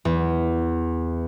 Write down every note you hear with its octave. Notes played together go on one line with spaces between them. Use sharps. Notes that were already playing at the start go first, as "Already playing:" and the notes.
E2